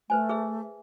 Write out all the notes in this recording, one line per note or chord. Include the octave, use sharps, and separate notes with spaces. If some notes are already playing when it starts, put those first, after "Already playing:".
A3 B4 C5 G#5
G#4 E5